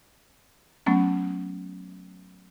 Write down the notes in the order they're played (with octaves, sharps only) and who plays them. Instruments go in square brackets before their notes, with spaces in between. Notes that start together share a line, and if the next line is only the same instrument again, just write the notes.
[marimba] F#3 A3 B3 C#4